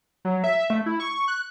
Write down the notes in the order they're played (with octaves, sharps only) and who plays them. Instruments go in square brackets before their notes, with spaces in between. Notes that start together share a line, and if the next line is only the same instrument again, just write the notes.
[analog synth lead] F#3
E5
A3
E4
C#6
F#6